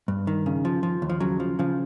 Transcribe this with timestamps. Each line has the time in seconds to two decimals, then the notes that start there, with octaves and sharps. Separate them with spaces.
0.08 G2
0.27 D#3
0.46 C#3
0.65 F3
0.83 F3
1.02 D#2
1.10 F3
1.20 C#3 F#3
1.40 F3
1.59 C#3 F3